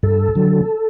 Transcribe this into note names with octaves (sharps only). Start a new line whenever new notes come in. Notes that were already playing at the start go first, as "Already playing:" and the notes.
G2 A4
D3 F#3